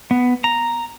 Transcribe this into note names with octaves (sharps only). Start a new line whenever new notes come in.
B3
A#5